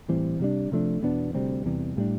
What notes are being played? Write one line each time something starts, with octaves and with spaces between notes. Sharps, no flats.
A2 E3 G3 C4
C3 G3 D4
C3 F3 A3 D4
E2 B2 B3 D4
D2 C3 G3 C4
E2 C3 E3 G3
A2 G3 D4